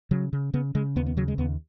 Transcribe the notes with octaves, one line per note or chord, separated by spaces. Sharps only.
C#3 F#3
C#3
C#3 B3
C#3 G#3
D#2 B3
B3
C#3 F#3
G#3
D#2 B3